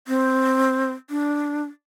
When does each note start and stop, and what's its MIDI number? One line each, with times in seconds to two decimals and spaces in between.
0.08 0.92 60
1.10 1.63 62